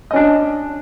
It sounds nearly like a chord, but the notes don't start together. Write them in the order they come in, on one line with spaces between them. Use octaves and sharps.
D#5 C#4 D4